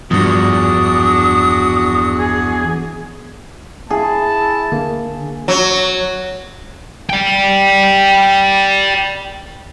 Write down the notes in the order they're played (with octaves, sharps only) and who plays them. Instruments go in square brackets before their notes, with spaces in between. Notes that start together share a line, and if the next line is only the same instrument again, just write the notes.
[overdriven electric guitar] E2 [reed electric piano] G2 F3 [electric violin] D4 F#4 [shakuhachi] D#6
[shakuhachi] G#4
[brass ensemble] E4 A5 [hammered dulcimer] G#4 [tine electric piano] G#5
[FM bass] D3 [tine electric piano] A#3
[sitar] F#3
[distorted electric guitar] D5 G5